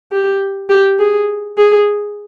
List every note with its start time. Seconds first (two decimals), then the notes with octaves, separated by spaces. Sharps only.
0.12 G4
0.70 G4
0.99 G#4
1.58 G#4